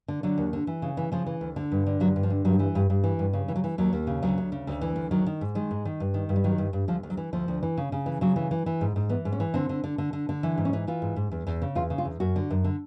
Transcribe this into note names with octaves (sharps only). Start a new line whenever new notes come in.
D3
D3 F#3
D#2
D3
E3
C#3
E3
C#3 F3
E3
D2
D3
G2
D3
G2 F#3
G2
F3
D3
G2 F#3
E3
G2
G2
E3
G2
C#3
E3
F#3
E3
D#2 F#3
D#2
C#3
D2 F#3
D2
C#3
D2
E3
D2
D#3 F#3
D#3
G#2
D#3 G#3
G#2
D#3
G2
D#3
G2
G3
D#3 F#3
G2
G2
D2 F3
D2
F#3
E3
D2 F3
D2
E3
C#3
C#3
E3
C#3 F#3
E3
E3
E3
G#2
G#2
E3 B3
G#2
C#4
E3
D3 C4
D3
D3
D3
D3
D3
E3
G#2
C#4
E3
E3 F4
G#2
G#2
E2
E2
C#3
E2 F4
C#3
F4
E2
F#2 F#4
D3
F#2
D3